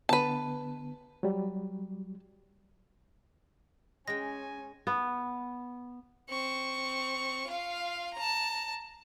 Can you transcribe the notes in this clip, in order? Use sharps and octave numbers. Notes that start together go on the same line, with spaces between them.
D3 B3 B4 A5
F#3 G3
G#3 C#4 G5 G#5 A#6
B3
C4 C#6
F4 F5
A5 A#5